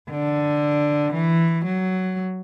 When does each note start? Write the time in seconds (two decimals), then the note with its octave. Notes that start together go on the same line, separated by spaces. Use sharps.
0.10 D3
1.14 E3
1.66 F#3